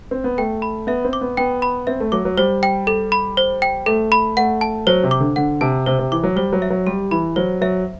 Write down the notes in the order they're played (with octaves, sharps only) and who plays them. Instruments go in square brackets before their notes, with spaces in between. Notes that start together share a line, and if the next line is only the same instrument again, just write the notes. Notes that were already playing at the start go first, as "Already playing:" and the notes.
[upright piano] C4
B3
[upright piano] A3 [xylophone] G5
[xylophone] B5
[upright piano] B3 [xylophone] E5
[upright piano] C4
[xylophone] D6
[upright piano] B3
[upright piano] B3 [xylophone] G5
[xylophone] B5
[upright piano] C4 [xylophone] E5
[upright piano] A3
[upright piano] F#3 [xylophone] D6
[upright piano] F#3
[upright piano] G3 [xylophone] C5
[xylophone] G5
A4
B5
C5
G5
[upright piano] A3 [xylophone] A4
[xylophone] B5
[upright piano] A3 [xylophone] F#5
[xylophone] A5
[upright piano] F#3 [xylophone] C5
[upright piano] C3
[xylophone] D6
[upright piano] D3
[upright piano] D3 [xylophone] F#5
[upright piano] C3 [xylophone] A5
[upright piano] C3 [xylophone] C5
[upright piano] C3
[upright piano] E3 [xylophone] D6
[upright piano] F#3
[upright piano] G3 [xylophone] C5
[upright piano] F#3
[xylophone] E5
[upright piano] F#3
[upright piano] G3 [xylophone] G4
[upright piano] E3 [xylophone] B5
[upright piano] F#3 [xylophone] C5
[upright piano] F#3 [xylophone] E5